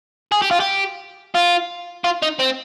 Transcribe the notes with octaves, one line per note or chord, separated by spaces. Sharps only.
G#4
G4
F4
G4
F4
F4
D#4
C4